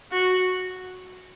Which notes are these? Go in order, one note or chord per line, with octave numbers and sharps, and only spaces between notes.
F#4